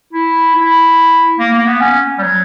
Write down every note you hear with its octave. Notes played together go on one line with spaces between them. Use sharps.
E4
E4
A#3
A#3
B3
C#4
G3
F#3